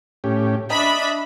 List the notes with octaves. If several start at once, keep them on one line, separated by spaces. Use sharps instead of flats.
A2 C#4 G4
D4 D#5 E5 B5